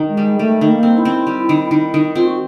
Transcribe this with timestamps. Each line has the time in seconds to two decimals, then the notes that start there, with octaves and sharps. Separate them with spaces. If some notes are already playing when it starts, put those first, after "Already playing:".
Already playing: D#3
0.09 G#3
0.17 G3
0.39 G3 A3
0.61 D#3
0.68 A#3
0.83 C4
0.98 E4
1.05 C4
1.27 G3
1.49 D#3
1.71 D#3
1.94 D#3
2.15 C4 F4
2.26 F#4